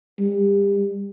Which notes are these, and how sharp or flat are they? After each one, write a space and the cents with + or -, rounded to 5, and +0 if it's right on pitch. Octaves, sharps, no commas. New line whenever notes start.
G3 +30